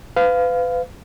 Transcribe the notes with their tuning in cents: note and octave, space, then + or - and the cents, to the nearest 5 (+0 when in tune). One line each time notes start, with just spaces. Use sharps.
B4 +35 F5 +0